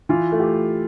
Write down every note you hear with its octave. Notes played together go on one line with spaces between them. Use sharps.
E3 F4
A3
G4